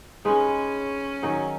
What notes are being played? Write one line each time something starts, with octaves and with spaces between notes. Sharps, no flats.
G#3 C#4 D#4 G#4 B4
D#3 F#3 D#4 G#4